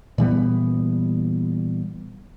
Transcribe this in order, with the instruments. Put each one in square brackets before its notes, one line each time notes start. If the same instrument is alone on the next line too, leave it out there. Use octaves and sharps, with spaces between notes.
[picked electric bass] A#2 E3 G3 B3